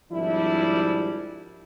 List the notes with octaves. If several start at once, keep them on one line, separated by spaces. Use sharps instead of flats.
G#1 F3 G3 D4 E4